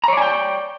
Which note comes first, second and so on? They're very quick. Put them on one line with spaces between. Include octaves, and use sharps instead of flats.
A#5 C#5 D5 G#5 G5